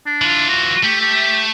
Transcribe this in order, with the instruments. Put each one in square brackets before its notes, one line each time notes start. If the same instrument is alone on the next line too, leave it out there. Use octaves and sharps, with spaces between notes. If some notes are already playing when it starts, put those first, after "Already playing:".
[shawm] D4
[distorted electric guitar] E3 F4
[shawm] F#4
[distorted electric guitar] A3 [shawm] G4
[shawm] G4